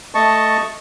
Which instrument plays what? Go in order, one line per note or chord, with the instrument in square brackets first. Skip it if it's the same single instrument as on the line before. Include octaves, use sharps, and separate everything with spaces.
[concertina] A3 D#5 A5 C#6